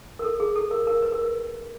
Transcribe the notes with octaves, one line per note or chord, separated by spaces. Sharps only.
A#4
A4
G#4
A4
A#4
A#4
B4
A#4
B4